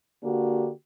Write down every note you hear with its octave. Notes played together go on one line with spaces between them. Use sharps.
D3 A#3 D4 F#4 G4